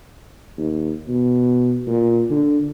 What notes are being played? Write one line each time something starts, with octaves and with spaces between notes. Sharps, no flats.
D#2
B2
A#2
D3